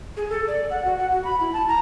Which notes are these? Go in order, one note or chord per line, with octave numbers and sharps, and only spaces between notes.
G#4
A4
D5
F#5
F#4
F#5
F#4
B5
E4
A5
A#5